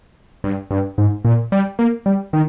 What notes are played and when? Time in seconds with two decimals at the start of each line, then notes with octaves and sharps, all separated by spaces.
0.44 G2
0.71 G2
0.98 G#2
1.25 A#2
1.52 G3
1.79 A#3
2.06 G3
2.33 D#3